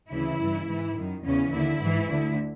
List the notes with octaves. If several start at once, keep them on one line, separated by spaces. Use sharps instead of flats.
D2 C#3 E3 E4
G2 E3
G#2 E3
F#2 D#3
E2 C#3 E3 C#4
D#2 D3 E4
G#2 E3
D2 D3